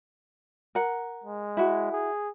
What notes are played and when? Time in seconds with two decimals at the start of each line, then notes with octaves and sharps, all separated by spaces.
0.75 A#4 F#5
1.24 G#3
1.57 E4 F#4
1.92 G#4